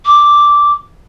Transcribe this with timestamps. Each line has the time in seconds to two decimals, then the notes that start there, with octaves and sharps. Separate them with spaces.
0.05 D6